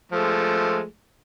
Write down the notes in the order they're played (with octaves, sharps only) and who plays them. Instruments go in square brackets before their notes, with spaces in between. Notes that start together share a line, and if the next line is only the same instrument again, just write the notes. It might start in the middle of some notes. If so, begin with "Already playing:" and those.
[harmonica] F3 G#3 A3